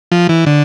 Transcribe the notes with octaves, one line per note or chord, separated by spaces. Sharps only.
F3
E3
D3